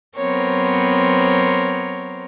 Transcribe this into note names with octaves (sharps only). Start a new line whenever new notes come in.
F#3 B3 C4 A#4 C5 C#5